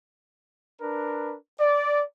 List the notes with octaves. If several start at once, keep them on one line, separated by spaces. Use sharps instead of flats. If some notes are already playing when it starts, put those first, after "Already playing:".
D4 A#4 B4
D5